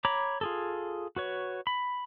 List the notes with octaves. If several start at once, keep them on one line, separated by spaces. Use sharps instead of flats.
C#5 A#5 B5 D6
F4 G#4 A4
F#4 B4 C#5
B5